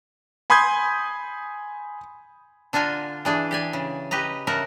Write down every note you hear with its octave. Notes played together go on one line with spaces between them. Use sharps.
G#5 B5 C6 D#6 G6 G#6
D3 D4 F4 G#5 A#5
E3 D4 G#4
G4 D5 G#5
C#3
G4 B4 D#5 A#5
C#3 A3 F#4 A#4